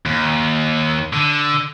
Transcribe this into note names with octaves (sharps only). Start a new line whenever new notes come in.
D#2
D3